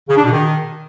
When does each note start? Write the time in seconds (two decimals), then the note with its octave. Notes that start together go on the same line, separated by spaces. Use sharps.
0.09 C#3
0.16 D4
0.24 B2
0.31 D#3